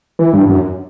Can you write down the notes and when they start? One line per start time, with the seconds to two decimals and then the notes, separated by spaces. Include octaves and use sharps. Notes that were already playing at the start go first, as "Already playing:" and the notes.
0.19 E3
0.33 G2
0.49 F#2